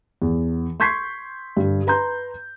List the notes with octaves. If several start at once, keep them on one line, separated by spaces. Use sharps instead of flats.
E2
C6 C#6 G6 G#6 B6 C7
G2 D3
B4 A#5 C6 G6